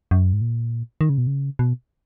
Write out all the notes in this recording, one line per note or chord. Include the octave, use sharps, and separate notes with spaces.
F#2
G#2
A#2
D#3
C#3
B2
C#3
B2